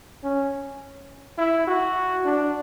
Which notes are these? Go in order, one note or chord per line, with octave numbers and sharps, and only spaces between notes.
C#4
E4
F#4
D4